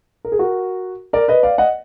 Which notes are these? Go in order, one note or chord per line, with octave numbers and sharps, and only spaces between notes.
A#4
G#4
F#4 A#4
A#4 D5
B4 D#5
D5 F5
D#5 F#5